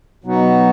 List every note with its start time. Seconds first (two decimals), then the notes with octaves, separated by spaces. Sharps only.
0.24 B2 F#3 B3 D#4 F#4